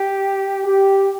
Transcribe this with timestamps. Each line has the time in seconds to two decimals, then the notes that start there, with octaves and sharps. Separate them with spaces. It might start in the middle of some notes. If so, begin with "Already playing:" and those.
Already playing: G4
0.64 G4